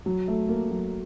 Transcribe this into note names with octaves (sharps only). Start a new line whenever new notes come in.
F#3
A3
A#3
F#3